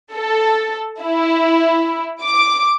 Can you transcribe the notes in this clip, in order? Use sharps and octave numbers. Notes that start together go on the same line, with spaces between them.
A4
E4
D6